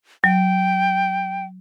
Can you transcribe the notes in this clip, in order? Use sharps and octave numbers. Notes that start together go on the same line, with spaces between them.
F#3 G5